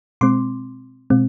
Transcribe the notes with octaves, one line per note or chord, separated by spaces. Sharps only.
B2 G#3 C4 C6 D6
B2 G#3 C4